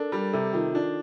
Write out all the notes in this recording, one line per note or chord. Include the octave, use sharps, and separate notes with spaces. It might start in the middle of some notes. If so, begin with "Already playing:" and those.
Already playing: D4 A4 A#4
G3 A#4
C3 A4
D#3 F4
D4 F4